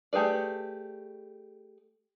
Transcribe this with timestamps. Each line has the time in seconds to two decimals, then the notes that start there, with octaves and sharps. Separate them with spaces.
0.13 A3 G4 G#4 B4 D5